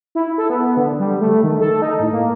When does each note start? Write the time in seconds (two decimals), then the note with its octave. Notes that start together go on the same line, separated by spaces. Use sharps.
0.15 E4
0.38 A4
0.50 B3
0.77 D3
1.00 G3
1.21 A3
1.44 D#3
1.61 A4
1.82 D#4
2.00 A2
2.13 A#3